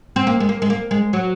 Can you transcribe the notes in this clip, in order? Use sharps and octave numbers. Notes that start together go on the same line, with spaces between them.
C4
A#3
G#3
A#3
G#3
A#3
G#3
F#3